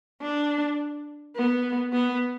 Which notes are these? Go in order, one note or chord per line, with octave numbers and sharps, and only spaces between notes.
D4
B3
B3